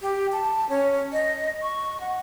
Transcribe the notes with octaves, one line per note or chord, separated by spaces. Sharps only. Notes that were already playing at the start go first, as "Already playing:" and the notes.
G4
A5
C#4
D#5
C#6
F#5